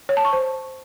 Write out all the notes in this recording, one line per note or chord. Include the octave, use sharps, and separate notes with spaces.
C#5
A5
C#6
C5